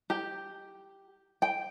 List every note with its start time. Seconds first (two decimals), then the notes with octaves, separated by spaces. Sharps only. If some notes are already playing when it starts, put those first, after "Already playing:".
0.10 G4
1.42 G5